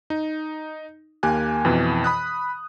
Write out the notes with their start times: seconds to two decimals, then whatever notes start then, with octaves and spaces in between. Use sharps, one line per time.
0.10 D#4
1.23 D#2 A#3 G4 G#5 F#6
1.65 F2 B2 E3
2.04 B5 D#6 F#6